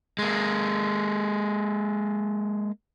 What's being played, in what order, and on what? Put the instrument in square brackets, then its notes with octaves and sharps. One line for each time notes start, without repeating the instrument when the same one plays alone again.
[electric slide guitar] G#3 A#3